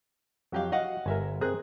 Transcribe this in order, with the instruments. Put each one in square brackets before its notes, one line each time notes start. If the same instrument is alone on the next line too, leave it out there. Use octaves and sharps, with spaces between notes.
[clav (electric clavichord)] F2 [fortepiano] F#3 G4 F5
[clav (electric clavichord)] F#4 [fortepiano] D#5 F5 F#5
[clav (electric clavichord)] G1 [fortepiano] A#4 E5 G#5
[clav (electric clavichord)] C4 A#4 [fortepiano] G#4 F#6